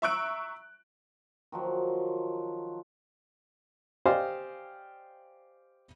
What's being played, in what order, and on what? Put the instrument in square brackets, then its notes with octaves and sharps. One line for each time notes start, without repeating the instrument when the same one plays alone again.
[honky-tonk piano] E5 A#5 C#6 E6 F#6 D7
[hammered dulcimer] D#3 F3 F#3
[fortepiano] G4 C5 D5 D#5 F5 G#5